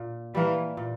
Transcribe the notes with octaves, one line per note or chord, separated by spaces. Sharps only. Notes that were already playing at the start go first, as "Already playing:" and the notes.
Already playing: A#2
E3 G3 A#3
A#2